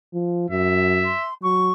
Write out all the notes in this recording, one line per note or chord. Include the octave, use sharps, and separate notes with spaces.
F3
F#2 E5
C6
F#3 C#6